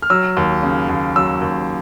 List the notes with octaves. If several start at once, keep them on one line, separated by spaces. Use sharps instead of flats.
F6
F#3 E6
D#2
C#3
D#2
F#3 E6
D#2